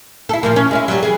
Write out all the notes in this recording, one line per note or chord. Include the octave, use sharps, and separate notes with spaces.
E4 A4
A#2 F3 A#3
C#4
G#3 C#4 E4
F#3 G3
E3 G#4